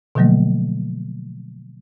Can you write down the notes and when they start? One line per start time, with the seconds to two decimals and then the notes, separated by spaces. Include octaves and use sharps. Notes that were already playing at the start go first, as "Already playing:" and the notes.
0.15 B2 D3 F3 F#3 A3 A#3